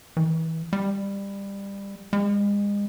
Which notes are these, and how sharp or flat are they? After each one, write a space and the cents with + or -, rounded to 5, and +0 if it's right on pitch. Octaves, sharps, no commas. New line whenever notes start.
E3 -30
G3 +20
G#3 -35